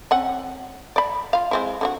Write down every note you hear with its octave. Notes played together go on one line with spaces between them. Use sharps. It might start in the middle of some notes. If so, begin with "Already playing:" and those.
C4 C#4 F#5
D5 B5
F4 F5
G#3 C4 E4
D3 D4 F#4